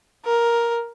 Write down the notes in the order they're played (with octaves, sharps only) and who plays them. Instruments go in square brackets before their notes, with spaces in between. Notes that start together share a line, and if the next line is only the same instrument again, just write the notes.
[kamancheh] A#4